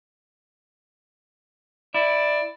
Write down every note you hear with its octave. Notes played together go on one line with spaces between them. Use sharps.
E4 D5